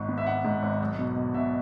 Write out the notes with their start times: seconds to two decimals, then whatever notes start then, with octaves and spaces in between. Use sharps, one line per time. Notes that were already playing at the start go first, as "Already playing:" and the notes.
Already playing: G#1 G#2 C#6
0.09 B3
0.18 E5
0.26 G#1 F#5
0.45 G#2
0.62 G#1
0.81 B1
0.99 B2
1.16 B2
1.34 B2 E5